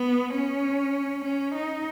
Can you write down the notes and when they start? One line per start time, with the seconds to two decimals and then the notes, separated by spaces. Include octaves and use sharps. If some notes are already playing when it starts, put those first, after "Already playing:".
Already playing: B3
0.35 C#4
1.25 C#4
1.54 D#4